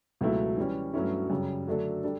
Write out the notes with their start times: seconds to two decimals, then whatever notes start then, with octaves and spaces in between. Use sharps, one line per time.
0.21 C#2 B2 F#3 A3 E4
0.57 E3 G3 C#4
0.94 G2 F#3 A3 C#4 E4
1.30 F#2 C#3 G3
1.67 D3 F#3 A3 D4 A4
2.04 G3 D4 A4